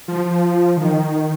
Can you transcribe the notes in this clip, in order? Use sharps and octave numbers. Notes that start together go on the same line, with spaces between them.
F3
D#3